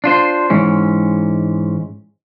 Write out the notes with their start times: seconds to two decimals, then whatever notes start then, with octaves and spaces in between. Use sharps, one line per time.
0.04 D4 F4 C5
0.50 G#2 E3 G#3 C#4